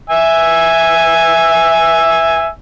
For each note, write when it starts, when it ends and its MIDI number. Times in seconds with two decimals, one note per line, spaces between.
0.10 2.48 76
0.10 2.48 80
0.10 2.48 88